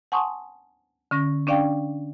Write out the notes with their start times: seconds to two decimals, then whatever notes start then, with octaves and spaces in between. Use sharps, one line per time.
0.12 F#5 G#5 A5 C6 C#6 D#6
1.11 D3 C#4 A#6
1.47 C#4 D4 D5 F5 G5